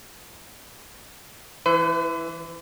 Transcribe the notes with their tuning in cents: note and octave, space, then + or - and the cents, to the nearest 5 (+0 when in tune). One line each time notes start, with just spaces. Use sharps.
E3 +0 B4 +45